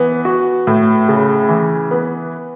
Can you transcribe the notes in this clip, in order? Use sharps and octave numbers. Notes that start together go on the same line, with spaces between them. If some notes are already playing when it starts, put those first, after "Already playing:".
Already playing: E3 B3
F#4
A2
C#3
E3
B3